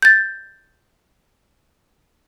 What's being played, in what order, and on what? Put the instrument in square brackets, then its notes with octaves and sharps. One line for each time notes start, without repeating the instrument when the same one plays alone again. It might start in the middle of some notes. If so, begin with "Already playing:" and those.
[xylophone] G6 A6